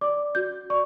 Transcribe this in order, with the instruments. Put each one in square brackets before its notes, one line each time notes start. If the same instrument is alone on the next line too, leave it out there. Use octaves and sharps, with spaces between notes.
[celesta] D5 D6
F#4 G6
D5 C#6